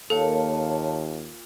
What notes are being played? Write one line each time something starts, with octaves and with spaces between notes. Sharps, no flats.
D#2 A#2 A4 C#5 F5 A5